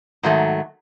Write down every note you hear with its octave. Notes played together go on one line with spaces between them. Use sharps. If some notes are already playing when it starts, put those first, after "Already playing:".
G#2 D#3 F#3 A3